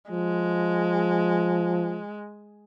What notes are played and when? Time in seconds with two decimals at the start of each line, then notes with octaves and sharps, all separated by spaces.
0.11 F3 G#3